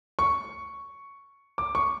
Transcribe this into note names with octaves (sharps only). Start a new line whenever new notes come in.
C#6
D6
C#6